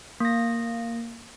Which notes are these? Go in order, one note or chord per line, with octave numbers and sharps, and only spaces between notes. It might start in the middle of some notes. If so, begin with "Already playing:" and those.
A#3 A#6